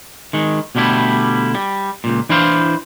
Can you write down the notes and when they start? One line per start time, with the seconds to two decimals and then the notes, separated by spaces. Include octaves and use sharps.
0.33 D#3 G#3
0.75 B2 D3 G3 A3 E4
1.55 G3
2.04 C#2 A#2
2.29 E3 D4 E4 B4 C5 F5